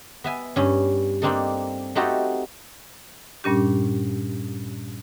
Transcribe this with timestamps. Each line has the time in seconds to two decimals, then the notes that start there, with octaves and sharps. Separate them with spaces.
0.24 B3 E5 G#5
0.56 G2 C#4
1.22 A#3 C4 D4 D#4 A4
1.95 A3 C4 D#4 F#4 G4 A4
3.44 G2 A#2 G3 C#4 D4 G4